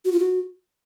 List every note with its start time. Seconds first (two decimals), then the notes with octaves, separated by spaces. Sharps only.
0.05 F#4
0.12 F4
0.19 F#4